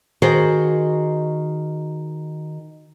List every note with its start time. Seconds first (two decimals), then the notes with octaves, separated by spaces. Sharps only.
0.22 D#3 F#4 G#4 C5